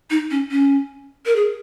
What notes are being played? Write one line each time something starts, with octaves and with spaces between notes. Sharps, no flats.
D#4
C#4
C#4
A#4
G#4